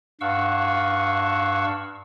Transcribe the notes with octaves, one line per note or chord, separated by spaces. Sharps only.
G2 F5 F#5 C#6 E6